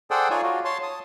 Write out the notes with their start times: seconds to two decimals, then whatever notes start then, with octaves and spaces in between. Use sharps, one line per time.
0.11 G#4 A4 C5 D5 F#5 G5
0.30 D#4 F4 G#4 C#5 D5 G#5
0.42 F4 F#4
0.65 C#5 A5 C6
0.83 A5 D#6